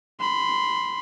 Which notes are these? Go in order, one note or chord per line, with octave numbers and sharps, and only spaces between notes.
B5 C6